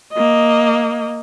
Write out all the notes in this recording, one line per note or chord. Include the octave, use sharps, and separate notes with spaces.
A#3 D#5